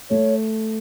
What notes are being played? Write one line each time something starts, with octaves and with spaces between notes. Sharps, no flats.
A3 C#5